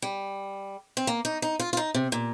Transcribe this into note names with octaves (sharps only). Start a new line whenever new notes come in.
G3
C4
A#3
D#4
D#4
F4
F4
D#4
C3
A#2